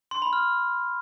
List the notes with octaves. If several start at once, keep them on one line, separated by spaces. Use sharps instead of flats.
C6
B5
F6